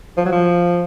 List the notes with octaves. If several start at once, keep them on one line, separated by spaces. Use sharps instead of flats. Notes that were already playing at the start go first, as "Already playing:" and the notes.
F3
F#3
F3